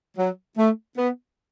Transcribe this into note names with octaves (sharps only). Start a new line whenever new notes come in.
F#3
A3
B3